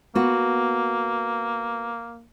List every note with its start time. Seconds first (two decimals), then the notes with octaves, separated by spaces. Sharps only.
0.15 A#3 B3 F#4